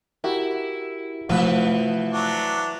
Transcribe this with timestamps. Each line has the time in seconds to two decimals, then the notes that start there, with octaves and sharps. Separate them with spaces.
0.24 E4 F#4 G4 A#4
1.29 C3 E3 F3 A3 F#4 B4 F5 F#5
2.13 F#3 D4